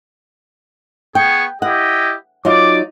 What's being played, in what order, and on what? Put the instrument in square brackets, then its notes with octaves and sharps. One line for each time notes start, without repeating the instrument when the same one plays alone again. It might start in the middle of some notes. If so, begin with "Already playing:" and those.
[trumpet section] B3 G#4 C#6 [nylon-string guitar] G5
[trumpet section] E4 G4 D#5 [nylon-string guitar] F#5
[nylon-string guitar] F#3 D#4 F4 [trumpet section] D5 D6